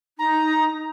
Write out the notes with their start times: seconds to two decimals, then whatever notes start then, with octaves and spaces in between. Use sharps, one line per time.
0.19 D#4 A#5